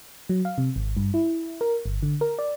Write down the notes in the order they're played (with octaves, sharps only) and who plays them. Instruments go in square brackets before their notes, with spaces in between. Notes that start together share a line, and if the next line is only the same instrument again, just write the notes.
[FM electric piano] F#3
F5
C3
G#1
G2
E4
A#4
G1
D3
A#4
D5